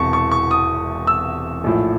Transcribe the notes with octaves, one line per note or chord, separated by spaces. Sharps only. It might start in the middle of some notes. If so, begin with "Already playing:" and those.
Already playing: E1 E2 C3 A5 C#6
C#6
C#6
D#6
E6
A#1 A2 F3